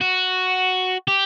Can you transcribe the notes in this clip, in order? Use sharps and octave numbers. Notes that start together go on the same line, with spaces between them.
F#4
G4